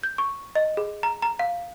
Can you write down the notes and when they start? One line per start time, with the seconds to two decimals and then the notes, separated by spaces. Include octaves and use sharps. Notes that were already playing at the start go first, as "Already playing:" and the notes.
0.03 G6
0.18 C#6
0.55 D#5
0.77 G#4
1.03 A#5
1.22 A#5
1.39 F5